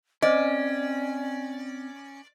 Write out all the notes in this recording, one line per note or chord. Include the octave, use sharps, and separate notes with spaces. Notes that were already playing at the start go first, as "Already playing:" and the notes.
C4 C#4 C5 D5 D#5